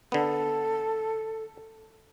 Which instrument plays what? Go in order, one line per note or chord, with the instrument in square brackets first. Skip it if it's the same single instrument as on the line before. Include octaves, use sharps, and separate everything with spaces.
[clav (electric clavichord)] D3 B3 [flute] A4